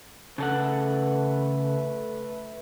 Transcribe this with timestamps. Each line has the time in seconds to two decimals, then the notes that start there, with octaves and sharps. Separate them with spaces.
0.38 C#3 A3 A4 B4 F#5